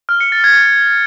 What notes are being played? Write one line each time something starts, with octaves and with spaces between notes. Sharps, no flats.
F6
C#7
A6
G#6